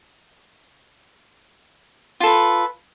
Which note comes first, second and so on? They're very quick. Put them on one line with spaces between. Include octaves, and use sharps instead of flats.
F4 A4 B4